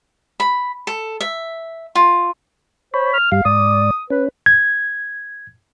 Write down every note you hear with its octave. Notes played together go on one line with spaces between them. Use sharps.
B5
A4
E5
F4
C5 C#5 B5
F6
G2 G3 F5
G#2 D5 D#6
C#4 B4
G#6